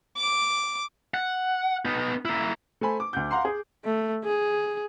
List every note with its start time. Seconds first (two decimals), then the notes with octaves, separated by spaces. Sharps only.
0.17 D6
1.14 F#5
1.85 B3 D#4
2.25 A#3 E4
2.81 A3 C5 G#5 B5
3.00 D6
3.13 D2 F#5 G6
3.31 F5 F#5 A#5 C6
3.45 G#4
3.85 A3
4.25 G#4